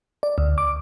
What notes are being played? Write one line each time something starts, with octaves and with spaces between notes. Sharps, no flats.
D5
D2
D6